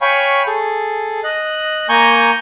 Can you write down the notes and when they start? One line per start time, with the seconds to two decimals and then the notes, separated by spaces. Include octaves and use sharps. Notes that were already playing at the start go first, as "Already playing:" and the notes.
0.01 C#5 F5 G5 G#5 B5 C#6
0.47 G#4 A4
1.24 D#5 F#6
1.89 A#3 G#5 A#5 C#6 G6